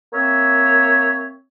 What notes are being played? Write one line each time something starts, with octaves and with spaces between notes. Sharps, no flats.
A#3 C4 C#5 E5